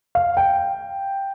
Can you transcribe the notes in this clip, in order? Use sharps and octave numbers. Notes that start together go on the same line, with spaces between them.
F5
G5